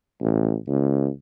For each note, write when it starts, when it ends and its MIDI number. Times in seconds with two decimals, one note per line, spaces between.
0.21 0.55 33
0.68 1.09 37